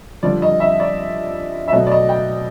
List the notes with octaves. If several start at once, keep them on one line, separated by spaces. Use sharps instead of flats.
G2 D3 F3 D5
D#5
E5
D5
E5
B2 F#3 A3 D#5
D5
D#5
G5